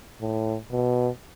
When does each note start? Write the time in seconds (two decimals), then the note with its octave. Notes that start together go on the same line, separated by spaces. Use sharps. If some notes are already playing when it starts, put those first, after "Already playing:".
0.20 A2
0.72 B2